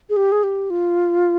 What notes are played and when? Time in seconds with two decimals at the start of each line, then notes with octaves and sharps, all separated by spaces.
0.10 G#4
0.17 G4
0.32 G#4
0.43 G4
0.70 F4